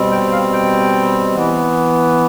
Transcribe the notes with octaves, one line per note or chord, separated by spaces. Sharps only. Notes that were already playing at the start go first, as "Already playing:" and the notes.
Already playing: B2 G3 C4
G5
F5
G5
E3 B3